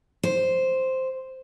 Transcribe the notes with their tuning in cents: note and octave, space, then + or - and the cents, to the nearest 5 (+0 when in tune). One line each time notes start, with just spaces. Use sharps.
C5 +0